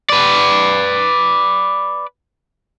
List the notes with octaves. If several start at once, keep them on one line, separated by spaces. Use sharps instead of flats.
B4 D5